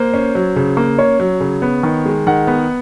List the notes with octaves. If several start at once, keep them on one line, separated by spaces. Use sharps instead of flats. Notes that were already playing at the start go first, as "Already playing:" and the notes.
Already playing: A#3 C5
C#4
F#3
C#3
A#3
C#4 C#5
F#3
C#3
B3
D#3
G#3
D#3 F#5
B3